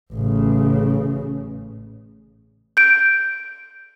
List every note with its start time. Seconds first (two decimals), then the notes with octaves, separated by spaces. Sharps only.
0.13 A1 C#3
2.77 G6 D7